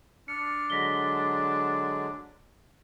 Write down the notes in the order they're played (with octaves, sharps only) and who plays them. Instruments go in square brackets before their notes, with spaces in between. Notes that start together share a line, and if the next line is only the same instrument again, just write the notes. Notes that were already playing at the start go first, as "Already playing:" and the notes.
[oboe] D4 [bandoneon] F6 [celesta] C#7
[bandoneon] D3 F#3 G#3 [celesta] A#6 B6 G7